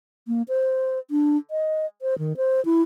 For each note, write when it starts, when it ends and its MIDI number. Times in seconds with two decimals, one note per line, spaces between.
0.28 0.42 58
0.48 0.99 72
1.11 1.37 62
1.51 1.86 75
2.02 2.18 72
2.19 2.36 51
2.37 2.63 72
2.65 2.82 64